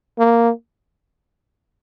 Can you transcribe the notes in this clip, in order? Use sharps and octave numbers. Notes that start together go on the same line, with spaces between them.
A#3